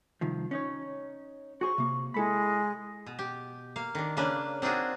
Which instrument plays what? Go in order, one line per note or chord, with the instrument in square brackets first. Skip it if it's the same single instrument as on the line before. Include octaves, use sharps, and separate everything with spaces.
[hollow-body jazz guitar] C2 D#3 F3
C#4 D#4 C#5
[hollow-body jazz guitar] F#4 G#4 C5 [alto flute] C#6
[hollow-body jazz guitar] C3 A#3
[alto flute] G#3 [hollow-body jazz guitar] E4 A4 B5
[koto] B2
G4
A#3 F5
D#3 D4
C#3 A#3 C#4 D4 B4
C4 D4 D#4 F4 F#4 G#4